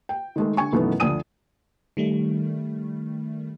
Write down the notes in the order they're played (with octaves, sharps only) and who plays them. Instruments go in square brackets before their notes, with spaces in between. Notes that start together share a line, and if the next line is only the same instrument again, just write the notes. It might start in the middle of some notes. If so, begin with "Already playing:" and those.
[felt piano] G5
D#3 G#3 A3
D3 G#5 C#6
F#2 B2 D#3 E3 A3 B3
D2 F3 D4 G#5 D#6 D#7
[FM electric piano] D#3 G3 A3